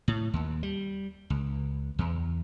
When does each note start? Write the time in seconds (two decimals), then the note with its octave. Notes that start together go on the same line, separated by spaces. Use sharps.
0.08 A2
0.33 D#2
0.63 G3
1.30 C#2
1.99 E2